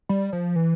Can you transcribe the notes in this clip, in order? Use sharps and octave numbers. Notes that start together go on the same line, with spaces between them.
G3
F3
E3